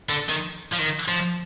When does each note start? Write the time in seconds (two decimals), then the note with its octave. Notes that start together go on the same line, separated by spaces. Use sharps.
0.09 D3
0.29 D#3
0.72 F3
0.78 D#3
1.08 F3